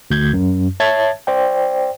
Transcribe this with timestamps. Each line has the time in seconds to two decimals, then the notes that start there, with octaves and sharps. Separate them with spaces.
0.11 D2 G6 G#6
0.33 F#2
0.80 C#5 E5 A5 G#6 A6
1.27 C5 D5 G5